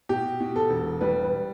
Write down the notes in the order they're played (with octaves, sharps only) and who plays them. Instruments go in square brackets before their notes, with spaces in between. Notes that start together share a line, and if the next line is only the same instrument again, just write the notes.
[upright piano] B2 G4
B2
A4
E1
G3 B4
B4